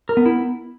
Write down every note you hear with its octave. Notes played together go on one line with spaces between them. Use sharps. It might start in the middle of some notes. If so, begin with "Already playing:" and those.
A#4
B3
E4